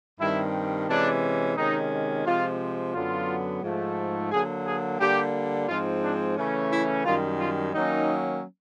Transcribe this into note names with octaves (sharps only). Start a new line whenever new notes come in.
G2 D#3 G3 C4 E4
C3 E3 G#3 C#4 D4
C3 D#3 G#3 C#4 D#4
C3 F3 G#3 F4
F#2 D3 F#3 B3 F4
G#2 F3 A3
D3 F#3 A#3 G#4
G#4
D3 G3 A#3 G4
G#2 F3 G#3 C4 F4
D4
C#3 E3 A3 C#4
E4
F#2 D#3 G3 F4
F4
D#3 F#3 A#3 C#4 D#4